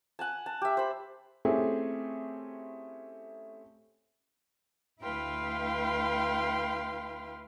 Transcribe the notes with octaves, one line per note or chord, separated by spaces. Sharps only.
F#5 G#5 A5
A5
G4 E5
C5 B5
A3 C4 C#4 E4 G4 G#4
D2 E4 B4 F5 G5 C6